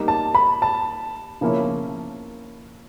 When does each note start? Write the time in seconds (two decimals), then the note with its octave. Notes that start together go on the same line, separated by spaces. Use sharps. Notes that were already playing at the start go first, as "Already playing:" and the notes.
Already playing: G3 A#3 D#4
0.08 A5
0.35 B5
0.62 A5
1.41 C#3 F3 A#3 C#4 E4